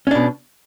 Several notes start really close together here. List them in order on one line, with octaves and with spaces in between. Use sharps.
C#4 D4 B2